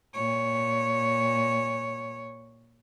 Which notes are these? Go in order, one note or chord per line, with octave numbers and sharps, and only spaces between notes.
A#2 C#5